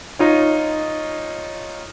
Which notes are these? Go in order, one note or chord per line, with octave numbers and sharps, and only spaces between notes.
D#4 F4 C#5